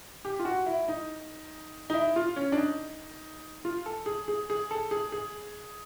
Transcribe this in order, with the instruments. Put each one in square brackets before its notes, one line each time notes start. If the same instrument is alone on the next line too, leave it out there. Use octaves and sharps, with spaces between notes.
[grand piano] G4
F4
F#4
E4
D#4
D#4
E4
F4
C#4
D4
D#4
F4
A4
G#4
G#4
G#4
A4
G#4
G#4